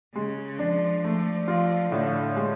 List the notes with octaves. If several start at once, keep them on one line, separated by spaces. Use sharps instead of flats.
C#3 G#3
F3 D4
F3 A3
F3 F4
A2 D3
G#3